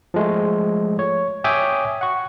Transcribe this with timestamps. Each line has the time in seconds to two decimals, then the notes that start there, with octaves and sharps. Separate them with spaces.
0.14 F3 G#3 A3
0.99 C#5
1.44 C#5 E5 G5 G#5 D6 D#6
2.01 F#5 C#6